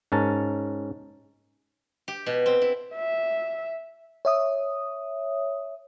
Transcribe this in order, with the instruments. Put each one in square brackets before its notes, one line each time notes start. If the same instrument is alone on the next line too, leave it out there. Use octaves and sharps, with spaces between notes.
[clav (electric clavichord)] G#2 C#4 A#4 A5
[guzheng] G4
B2
C4
E4
[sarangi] E5
[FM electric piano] C#5 E5 D#6